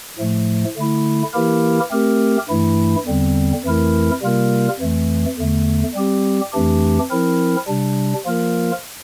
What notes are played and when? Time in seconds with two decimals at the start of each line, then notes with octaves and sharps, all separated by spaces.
0.18 A2 F3 A3
0.77 D3 A3 E4
1.33 E3 A#3 E4 G4 A#4
1.91 A3 C4 G4 A#4
2.49 G2 E3 A3 E4
3.06 E2 D3 G3 C4
3.64 F2 E3 A3 E4 A#4
4.22 C3 G3 A#3 F4 A#4
4.79 F2 E3 A3
5.37 E2 D3 A3
5.95 G3 C4 G4
6.52 F2 E3 A3 D4 G4
7.10 F3 C4 E4 A#4
7.68 C3 G3 D4
8.26 F3 A#3 F4 A#4